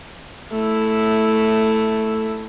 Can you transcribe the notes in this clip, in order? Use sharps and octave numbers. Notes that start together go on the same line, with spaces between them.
A3 E4